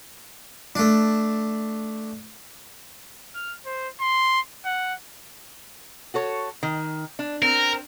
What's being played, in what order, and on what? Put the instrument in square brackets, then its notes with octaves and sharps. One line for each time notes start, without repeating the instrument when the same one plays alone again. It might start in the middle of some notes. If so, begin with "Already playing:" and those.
[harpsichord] A3 D4
[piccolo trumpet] F6
C5
C6
F#5
[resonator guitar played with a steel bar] F#4 A4 C#5
D#3
D4
[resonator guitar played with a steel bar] C4 [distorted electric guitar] A#4